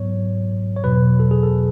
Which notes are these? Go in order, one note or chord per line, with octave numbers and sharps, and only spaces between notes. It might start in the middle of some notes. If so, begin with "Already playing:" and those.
Already playing: G#2 F#3 B3 C#5
C#5
E2 B2 F#3 B4
A4
G#4
A4